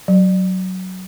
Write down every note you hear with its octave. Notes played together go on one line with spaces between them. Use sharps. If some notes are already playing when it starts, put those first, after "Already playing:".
F#3